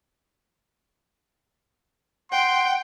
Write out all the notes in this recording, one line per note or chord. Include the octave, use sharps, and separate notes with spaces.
F#5 G5 C6